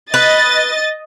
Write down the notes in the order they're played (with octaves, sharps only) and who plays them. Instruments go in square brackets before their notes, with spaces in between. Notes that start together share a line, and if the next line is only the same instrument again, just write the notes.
[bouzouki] B4 [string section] D#5 A6